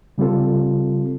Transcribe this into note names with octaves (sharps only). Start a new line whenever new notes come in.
C#3 G3 C4 F4 A4